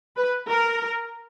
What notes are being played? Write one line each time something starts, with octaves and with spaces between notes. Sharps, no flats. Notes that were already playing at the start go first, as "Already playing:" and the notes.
B4
A#4